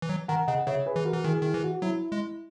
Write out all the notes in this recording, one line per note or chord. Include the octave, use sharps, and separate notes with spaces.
E3
F#3
D#3 F#5 A#5
C#3 D#5 F#5
C#3 C#5 E5
G#4 B4
E3
F#4 A#4
E3
D#3 E4 G#4
D#3 E4 G#4
E3
F#4
F#3 E4
G#3 E4